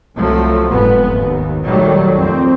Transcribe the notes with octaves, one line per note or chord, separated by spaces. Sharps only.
C2 F3 F#3 A3
F1 G#2 B3
D#2
A#1 D#3 F#3 G3 A3
F2 C4